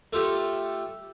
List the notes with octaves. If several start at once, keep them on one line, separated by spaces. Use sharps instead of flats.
A3 F4 G4 A4